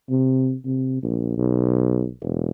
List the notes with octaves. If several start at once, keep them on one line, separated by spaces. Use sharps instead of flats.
C3
C3
A#1
B1
E1